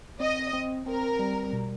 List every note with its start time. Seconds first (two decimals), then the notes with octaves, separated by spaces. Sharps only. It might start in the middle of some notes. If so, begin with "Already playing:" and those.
0.20 C4 D#5
0.53 C4
0.86 C4 A#4
1.19 G3
1.53 B2